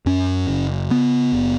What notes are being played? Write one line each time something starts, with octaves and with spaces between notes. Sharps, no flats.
F#2 C#4
F#1
C#3 B3
F#1